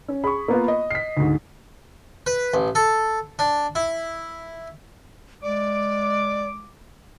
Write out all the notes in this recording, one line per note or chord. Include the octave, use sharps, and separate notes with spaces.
C#4
G#4 B5 C#6
A#3 B3 F4
D#5
B6 C7
D2 G#2
B4
A1
A4
D4
E4
G#3 D5 D6